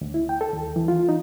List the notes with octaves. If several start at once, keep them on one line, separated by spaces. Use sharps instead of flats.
D2
E4
G5
A4
D#2
E3
F4
D#4